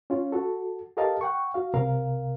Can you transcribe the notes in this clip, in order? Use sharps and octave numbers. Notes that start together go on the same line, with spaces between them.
C#4 F4
F#4 A4
G4 A4 A#4 D#5 F5 A5
F#5 G5 C#6
F#4 F5
C2 C3 A#4 F5